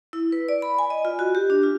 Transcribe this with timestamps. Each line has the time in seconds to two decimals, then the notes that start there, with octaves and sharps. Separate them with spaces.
0.13 E4
0.32 B4
0.49 D5
0.62 B5
0.79 G#5
0.90 D#5
1.05 F4
1.19 F#4
1.35 G4
1.50 D4
1.63 F4